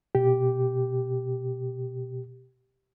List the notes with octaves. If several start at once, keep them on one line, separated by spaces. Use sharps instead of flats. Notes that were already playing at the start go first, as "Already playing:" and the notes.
B2 G4